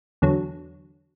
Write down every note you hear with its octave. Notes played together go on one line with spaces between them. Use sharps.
E2 D3 F#3